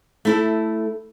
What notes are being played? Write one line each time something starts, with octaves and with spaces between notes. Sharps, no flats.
A3 E4 A4